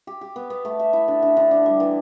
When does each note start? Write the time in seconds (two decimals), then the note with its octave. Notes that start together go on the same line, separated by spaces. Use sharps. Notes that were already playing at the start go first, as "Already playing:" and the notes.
0.07 G4
0.21 G4
0.36 B3
0.50 B3
0.65 A3
0.80 E5
0.93 E4
1.08 D3
1.23 D3
1.37 D3
1.51 D4
1.66 G3
1.80 E3